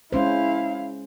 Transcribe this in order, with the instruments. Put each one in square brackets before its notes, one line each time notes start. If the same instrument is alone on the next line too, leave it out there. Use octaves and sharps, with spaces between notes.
[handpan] G#3 C#4 C5 [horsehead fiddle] E4 F5